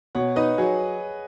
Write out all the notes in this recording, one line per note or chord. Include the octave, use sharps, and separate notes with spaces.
B2 C#5 F#5
D#4 B4 D#5
F#3 G#4 C#5